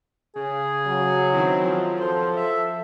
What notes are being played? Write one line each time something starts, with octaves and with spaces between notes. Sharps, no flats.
C#3 G#4
F#3
D#3 C4 E4
F3
A4 C5
E5